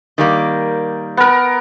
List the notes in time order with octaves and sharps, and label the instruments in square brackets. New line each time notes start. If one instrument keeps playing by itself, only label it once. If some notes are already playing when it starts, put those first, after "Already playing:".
[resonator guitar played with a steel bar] D#3 G3 A#3
[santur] B3 A#4